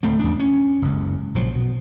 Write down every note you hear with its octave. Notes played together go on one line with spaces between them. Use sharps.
D1 A3 C4
E2 D4
C#4
F#1 C#2
A#1 F3 F#3
B2